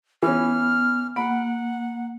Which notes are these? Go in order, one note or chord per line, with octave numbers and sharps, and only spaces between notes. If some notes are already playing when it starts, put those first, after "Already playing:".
E3 B3 C#4 F6
A#3 F#5 B5